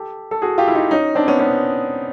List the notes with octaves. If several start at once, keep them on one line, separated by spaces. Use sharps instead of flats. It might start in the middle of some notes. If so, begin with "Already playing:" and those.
Already playing: G4 A4
A4
F#4 G#4
F4 G4
E4
D#4 F4
C#4 D#4
C4 D4
B3 C#4
B3 C#4